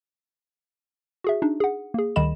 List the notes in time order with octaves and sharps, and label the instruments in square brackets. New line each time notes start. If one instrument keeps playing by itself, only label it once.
[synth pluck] F#4 G#4 E5
D4 D#4
G#4 F#5
A#3 G#4
D2 D#3 G3 D#5 B5 E7